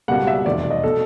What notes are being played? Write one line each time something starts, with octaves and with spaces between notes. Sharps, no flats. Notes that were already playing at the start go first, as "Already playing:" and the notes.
C#2 B2 G3 A#3 F#5
E5
F1 E2 B2 D5
D#5
B2 A4